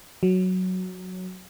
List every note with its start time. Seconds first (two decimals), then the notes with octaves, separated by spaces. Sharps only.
0.23 F#3